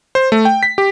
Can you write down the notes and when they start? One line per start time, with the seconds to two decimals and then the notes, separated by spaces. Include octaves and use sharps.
0.15 C5
0.32 A3
0.45 G5
0.63 B6
0.78 G4